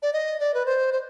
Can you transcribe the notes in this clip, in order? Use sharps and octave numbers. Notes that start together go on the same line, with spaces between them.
D5
D#5
D5
B4
C5
C5